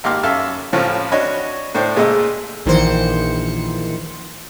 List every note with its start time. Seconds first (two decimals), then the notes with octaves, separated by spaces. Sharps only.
0.04 G#1 A#3 G4 C6 D6 F6
0.23 F#2 A4 E5 F5 F6
0.72 A1 A2 F3 C4 C#4
1.11 D4 F#4 C#5 D#5 B5
1.75 A2 D4 C5 G5
1.96 A#2 G#3 A3 A4 D#5
2.66 A#1 D#3 E3 A#3 C5 C#7